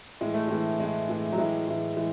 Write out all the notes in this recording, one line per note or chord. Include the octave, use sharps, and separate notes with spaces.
A2 E3 G#3
A3
A2 E3 G#3
A2 E3 G#3
A2 E3
F#3
A2 E3 G#3
A2 E3
E3 G#3